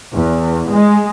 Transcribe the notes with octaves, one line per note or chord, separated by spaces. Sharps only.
E2
G#3